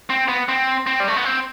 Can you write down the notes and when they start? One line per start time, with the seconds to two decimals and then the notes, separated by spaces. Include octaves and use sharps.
0.10 C4
0.28 B3
0.49 C4
0.87 C4
1.00 G3
1.08 A3
1.16 B3
1.25 C4